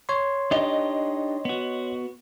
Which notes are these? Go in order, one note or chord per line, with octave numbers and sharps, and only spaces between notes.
C#5 C6
D4 D#4 G4 D#5
B3 F#4